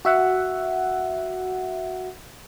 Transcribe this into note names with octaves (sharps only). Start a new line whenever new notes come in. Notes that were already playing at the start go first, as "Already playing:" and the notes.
F#4 E5 F#5